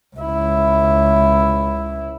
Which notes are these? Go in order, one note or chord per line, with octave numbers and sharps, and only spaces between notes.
C#2 E4